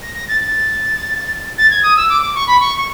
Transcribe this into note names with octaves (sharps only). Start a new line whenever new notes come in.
A#6
A#6
A6
A6
A6
G#6
D#6
E6
D6
D6
C#6
B5
C#6
C#6